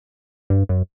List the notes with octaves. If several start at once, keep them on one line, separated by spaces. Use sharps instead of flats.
G2
F#2